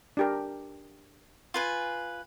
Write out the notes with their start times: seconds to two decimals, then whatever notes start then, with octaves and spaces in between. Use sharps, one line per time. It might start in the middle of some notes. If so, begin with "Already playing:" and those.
0.17 D4 G4 A#4
1.54 F4 B4 G#5